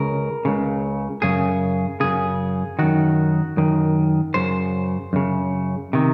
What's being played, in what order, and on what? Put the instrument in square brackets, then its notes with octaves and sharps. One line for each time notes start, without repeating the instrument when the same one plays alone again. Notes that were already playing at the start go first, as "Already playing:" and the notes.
Already playing: [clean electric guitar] C#2 C#3 A#4
C#2 C#3
F#2 C#3 G#4
F#2 C#3 G#4
F#2 D#3 F#4
F#2 D#3
F#2 C#3 C5
F#2 C#3
C3 D#3